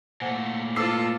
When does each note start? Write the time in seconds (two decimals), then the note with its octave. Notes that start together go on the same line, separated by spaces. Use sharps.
0.22 A#2 A3 C5 F#5 G#5
0.76 E4 F4 A4 B4 C5 D6 E6 C7